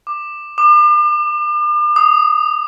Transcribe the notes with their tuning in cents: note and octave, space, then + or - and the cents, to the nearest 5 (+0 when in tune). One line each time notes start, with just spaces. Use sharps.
D6 +20
D6 +40
D#6 -5